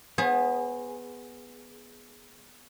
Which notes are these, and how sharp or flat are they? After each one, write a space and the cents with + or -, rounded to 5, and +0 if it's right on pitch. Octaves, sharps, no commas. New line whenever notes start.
B3 +0 G#4 +0 C5 +45